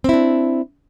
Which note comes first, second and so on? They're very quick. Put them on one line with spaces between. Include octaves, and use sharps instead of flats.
C4 E4 D4